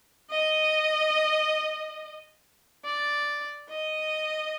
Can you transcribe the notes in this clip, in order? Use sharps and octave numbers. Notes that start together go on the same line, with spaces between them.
D#5
D5
D#5